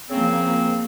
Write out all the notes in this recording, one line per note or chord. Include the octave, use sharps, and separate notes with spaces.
C#3 F3 A#3 C4